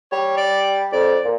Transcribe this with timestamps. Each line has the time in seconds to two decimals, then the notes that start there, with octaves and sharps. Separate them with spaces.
0.12 G3 C#5
0.37 D5
0.92 F2 D5
1.25 A#2